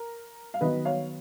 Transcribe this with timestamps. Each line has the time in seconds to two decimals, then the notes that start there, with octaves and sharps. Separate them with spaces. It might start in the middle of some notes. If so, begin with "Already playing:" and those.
Already playing: A#4
0.54 F5
0.61 D#3 F#3 B3 B4 D#5
0.85 C#5 F5